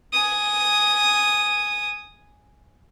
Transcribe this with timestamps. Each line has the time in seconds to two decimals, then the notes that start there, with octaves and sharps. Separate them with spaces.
0.13 G#5 D#6